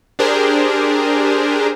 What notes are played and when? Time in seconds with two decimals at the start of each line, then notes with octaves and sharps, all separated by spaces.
0.19 D4 G4 G#4 A#4 C5